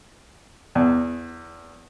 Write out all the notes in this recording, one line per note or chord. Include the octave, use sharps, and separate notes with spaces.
E2